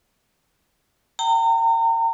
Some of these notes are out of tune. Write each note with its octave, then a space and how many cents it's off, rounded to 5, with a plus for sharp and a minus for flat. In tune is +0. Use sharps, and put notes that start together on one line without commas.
G5 -25 A#5 -35